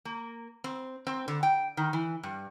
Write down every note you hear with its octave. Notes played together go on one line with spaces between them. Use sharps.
A#3
C4
C4
D3
G5
D#3
E3
G2